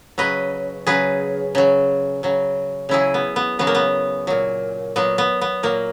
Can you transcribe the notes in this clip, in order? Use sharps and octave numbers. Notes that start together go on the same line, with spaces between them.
C#3 F#3 B4 D#5
C#3 F#3 G#4 B4
C#3 F#3
C#3 F#3
C#3 F#3 E4 G#4
B3
B3
C#3 F#3 B3
A#3
B3
A#2 F#3
A#2 F#3 B3
B3
B3
A#2 F#3 A#3